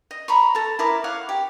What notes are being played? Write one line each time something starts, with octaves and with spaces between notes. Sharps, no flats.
D#5
A#5 B5 C#6
A4 A#5
E4 A#4 D6
C#5 F5 F#5 D6
G4